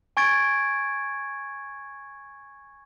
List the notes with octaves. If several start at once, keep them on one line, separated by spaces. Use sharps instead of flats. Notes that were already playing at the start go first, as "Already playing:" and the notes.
G#5 C#6 G#6 A6 D7